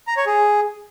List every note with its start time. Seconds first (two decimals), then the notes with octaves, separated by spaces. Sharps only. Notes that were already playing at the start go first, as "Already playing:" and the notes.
0.07 A#5
0.17 C#5
0.26 G#4